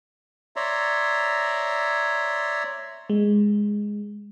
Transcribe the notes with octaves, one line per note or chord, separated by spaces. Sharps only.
C#5 D5 E5 A#5 C6
G#3